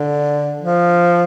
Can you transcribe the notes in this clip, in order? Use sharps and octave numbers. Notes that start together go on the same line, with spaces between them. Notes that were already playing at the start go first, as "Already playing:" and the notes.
Already playing: D3
F3